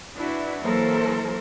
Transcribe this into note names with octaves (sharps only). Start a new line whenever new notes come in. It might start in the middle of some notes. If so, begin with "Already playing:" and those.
D4 E4 F#4 B4
E3 F#3 A#3 A4 A#4 C5